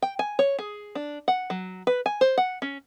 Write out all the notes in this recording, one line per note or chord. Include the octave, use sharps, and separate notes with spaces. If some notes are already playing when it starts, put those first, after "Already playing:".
G5
G#5
C#5
G#4
D4
F#5
F#3
B4
G#5
C5
F#5
C#4